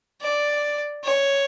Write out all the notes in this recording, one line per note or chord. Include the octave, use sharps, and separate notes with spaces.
D5
C#5